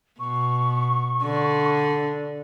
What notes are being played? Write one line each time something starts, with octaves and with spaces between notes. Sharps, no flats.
B2 C#6
D3